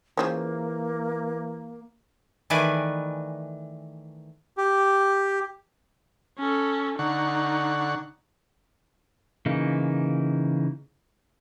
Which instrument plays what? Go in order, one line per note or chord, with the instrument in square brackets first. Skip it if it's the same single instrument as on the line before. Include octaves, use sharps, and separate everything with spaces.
[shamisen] C#3 F3 C#4 [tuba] E3 [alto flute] A#3
[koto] D#3 E3 A3 B4 D5 G#5
[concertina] G4
[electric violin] C#4 A4
[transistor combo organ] D3 F#5 C#6 [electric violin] D#4
[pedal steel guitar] C#3 E3 A#3 D#4